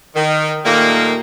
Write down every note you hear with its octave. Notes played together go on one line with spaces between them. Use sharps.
D#3
A#2 D#3 G3 A3 A#3